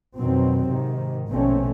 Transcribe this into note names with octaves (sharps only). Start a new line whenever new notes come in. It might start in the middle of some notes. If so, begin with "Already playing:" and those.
F2 B2 D#3 F#3 C4
G#2 C3 D#3
A#1 B2 D3 A3 C4 C#4